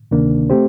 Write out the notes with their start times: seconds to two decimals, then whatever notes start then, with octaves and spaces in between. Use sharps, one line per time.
0.11 D2 C3 D#3 A#3 D4
0.50 A3 C4 G4 C5